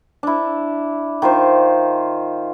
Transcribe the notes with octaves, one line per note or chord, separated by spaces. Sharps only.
D4 E4
D#3 F4 C5